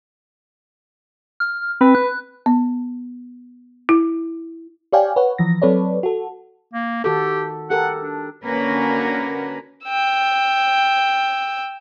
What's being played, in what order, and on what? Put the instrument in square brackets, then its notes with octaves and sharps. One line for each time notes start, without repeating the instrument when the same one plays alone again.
[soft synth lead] F6
[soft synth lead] C4 [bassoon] B4
[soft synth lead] F#6
[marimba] B3
E4
[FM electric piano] G4 C#5 D5 F5 G5 G#5
B4 C#5 F#5
E3 F3 A#6
F#3 C4 A4 B4 C#5 D5
F#4 A4
[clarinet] A#3
[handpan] D#3 F#4 A4 [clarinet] G4
[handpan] G4 A4 A#4 [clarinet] F#5
[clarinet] D4
[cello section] D3 A#3 C#4 F#4 A#4 B4
[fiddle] G5 E6